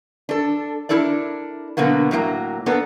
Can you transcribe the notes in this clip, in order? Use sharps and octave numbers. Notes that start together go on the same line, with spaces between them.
D4 A4
D4 E4 A4 A#4 D5
B2 D3 F#3 A#3 B3
A2 F#3 G#3 A#3
A#3 B3 D4 A4